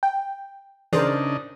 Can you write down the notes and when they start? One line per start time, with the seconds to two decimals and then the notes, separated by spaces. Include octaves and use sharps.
0.03 G5
0.93 C#3 E3 D4 D#4 G#4 A#4 C5 D5